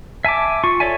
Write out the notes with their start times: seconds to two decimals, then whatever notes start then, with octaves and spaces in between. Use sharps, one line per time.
0.25 E5 G#5 A5 D6
0.64 F4 C#6
0.80 A4 C#5 D5 E5 G#5